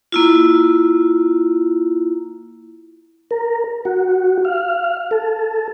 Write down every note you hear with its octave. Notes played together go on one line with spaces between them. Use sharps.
A#3 E4 F4
A#4
F#4
F5
A4